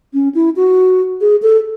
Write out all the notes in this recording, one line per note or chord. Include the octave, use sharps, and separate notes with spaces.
C#4
E4
F#4
G#4
A4